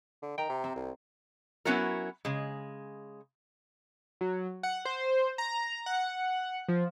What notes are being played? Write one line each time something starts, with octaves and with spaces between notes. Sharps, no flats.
D3
D#3 G5 A#5
C3
C4
C2
F#3 B3 C#4 E4 F#4 A#4
C#3 G#3
F#3
F#5
C5
A#5
F#5
F3